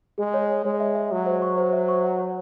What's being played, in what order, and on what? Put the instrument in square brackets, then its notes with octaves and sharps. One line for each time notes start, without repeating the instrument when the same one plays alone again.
[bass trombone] G#3 [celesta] G#4
[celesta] C#5
C#5
[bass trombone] G#3 [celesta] C#5
[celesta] E5
E5
[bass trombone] F#3 [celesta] E5
[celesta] C5
C#6
C5
E5
C#6
F#5
C#5